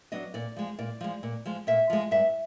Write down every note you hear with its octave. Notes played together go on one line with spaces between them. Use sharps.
F#3 B3 D4 D#5
A#2 D5
F3 G#3
A#2 D5
F3 G#3
A#2
F3 G#3
A#2 E5
F3 G#3
G2 E5